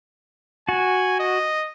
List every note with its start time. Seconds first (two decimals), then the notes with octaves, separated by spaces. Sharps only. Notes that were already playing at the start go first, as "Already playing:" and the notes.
0.69 F#4 G#5
1.20 D#5